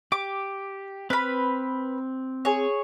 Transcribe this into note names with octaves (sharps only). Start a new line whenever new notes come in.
G4 D6
C4 B4 B5 F6
G#4 C#5